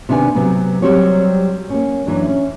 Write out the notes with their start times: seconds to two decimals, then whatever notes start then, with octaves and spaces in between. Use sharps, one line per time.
0.09 C3 D#3 B3 D4 F#4 G#5
0.35 C3 F#3 B3
0.82 F#3 G3 C4 F#4 C#5
1.70 A#3 C#4
2.07 F#2 E3 F#3 D4
2.29 C#4